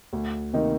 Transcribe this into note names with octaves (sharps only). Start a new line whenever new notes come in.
D2
C3 D#3 A#3 D#4